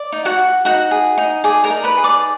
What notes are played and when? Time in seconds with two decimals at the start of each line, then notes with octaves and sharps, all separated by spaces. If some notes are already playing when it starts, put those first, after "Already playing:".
Already playing: D5
0.12 D#4
0.25 F#4 F#5
0.39 F#4
0.65 D#4 F#4 F#5
0.91 G#4
1.18 D#4
1.44 G#4 D5 G#5
1.64 A#4 A#5
1.70 D#4
1.84 B4 B5
1.97 G#4
2.04 D5 D6